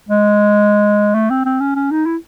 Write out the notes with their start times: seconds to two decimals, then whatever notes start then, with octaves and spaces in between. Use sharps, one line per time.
0.08 G#3
1.14 A3
1.30 C4
1.45 C4
1.60 C#4
1.75 C#4
1.91 D#4
2.06 E4